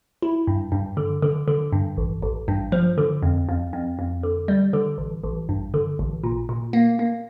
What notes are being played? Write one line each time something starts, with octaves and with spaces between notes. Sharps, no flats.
E4
G2
G2
D3
D3
D3
G2
A1
A1
G2
F3
D3
F2
F2
F2
F2
D3
G3
D3
A1
A1
G2
D3
A1
A#2
A#2
A#3
A#3